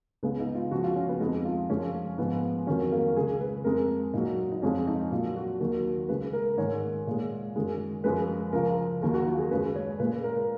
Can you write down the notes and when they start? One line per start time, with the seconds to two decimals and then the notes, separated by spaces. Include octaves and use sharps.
0.23 C#2 C#3 G#3 B3
0.40 D#4
0.55 F4
0.71 C#2 C#3 F3 F#4
0.84 F4
0.96 C#4
1.09 B3
1.20 F2 F3 G#3 D#4
1.45 F4
1.69 F#2 C#3 F3 G#3 C#4
2.18 G#2 F3 G#3 B3
2.67 F2 D#3 F#3 C#4
2.92 A#3
3.16 C#2 C#3 G#3 G#4
3.41 B4
3.64 F2 C#3 G#3 A#4
4.13 A#2 F#3 D#4
4.52 D#4
4.62 F2 C#3 F3 G#3 C#4
4.87 D#4
5.11 A#2 F#3 F4
5.36 F#4
5.60 D#2 D#3 F#3
6.09 C#2 C#3 G#3 B4
6.33 A#4
6.57 G#2 D#3 G#3 C#5
7.07 A#2 G#3
7.56 F#2 D#3 G#3
8.04 F#2 F3 G#3 B4
8.53 C#2 C#3 F3 A#4
9.02 D#2 D#3 F#3 A#4
9.14 F#4
9.26 F4
9.38 G#4
9.51 F#2 C#3 G#3 B4
9.76 C#5
9.99 A#2 G#3 B4
10.24 A#4